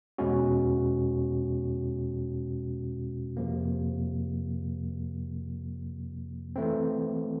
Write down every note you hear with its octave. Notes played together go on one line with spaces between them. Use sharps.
E2 B2 G#3 C#4 F#4
F2 C3 F3 A#3
E3 A3 C4